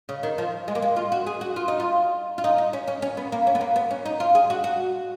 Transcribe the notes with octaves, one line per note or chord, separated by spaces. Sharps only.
C#3
D#3
F3
G#3
A#3
G#3
F4
F#4
G#4
F#4
F4
D#4
F4
F4
D#4
D#4
C#4
C#4
C#4
B3
A#3
C#4
B3
A#3
B3
C#4
D#4
F4
G#4
F#4
F#4